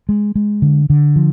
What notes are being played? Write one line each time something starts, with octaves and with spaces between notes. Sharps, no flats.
G#3
G#3
D3
D3
F3